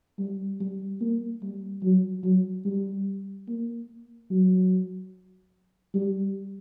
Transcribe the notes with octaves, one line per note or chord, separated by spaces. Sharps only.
G3
G3
A#3
G3
F#3
F#3
G3
A#3
F#3
G3